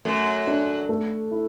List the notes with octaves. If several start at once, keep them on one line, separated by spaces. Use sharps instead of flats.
F#2 F#3 A3
D4
A3
E4